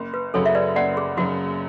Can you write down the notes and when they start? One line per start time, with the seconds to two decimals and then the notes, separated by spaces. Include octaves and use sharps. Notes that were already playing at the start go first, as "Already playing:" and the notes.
Already playing: F#1
0.14 B4
0.34 F#2 C#3 F#3 A4 C#5
0.46 E5
0.55 B4 D5
0.76 F#1 D5 F#5
0.97 G#4
1.17 F#2 C#3 F#3 F#4